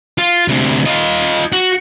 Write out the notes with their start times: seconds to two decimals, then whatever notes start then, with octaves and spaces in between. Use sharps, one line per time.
0.18 F4
0.48 D2 C3
0.86 F4 D#5
1.53 F#4